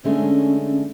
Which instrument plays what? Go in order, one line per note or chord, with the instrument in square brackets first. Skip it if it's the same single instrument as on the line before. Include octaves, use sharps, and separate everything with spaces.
[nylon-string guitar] D3 G#3 A3 [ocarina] C#4